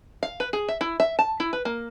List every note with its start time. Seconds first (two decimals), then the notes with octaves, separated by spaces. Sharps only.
0.23 F5
0.40 B4
0.53 G#4
0.68 E5
0.81 E4
1.00 E5
1.19 A5
1.40 E4
1.53 B4
1.65 A#3